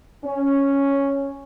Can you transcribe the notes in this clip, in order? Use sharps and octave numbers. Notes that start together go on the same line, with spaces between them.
C#4